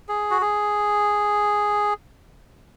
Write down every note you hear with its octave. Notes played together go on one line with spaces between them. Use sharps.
G#4
F#4
G#4